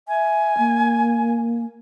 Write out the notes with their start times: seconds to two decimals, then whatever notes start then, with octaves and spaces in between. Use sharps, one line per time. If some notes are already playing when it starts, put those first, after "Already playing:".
0.08 E5 G#5
0.58 A#3